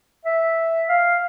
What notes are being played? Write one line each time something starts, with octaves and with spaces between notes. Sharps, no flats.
E5
F5